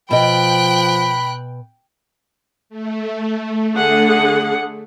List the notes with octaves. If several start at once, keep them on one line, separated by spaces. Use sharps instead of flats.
B2 F3 D#5 G5 B5 F#6
A3
D3 G#4 F#5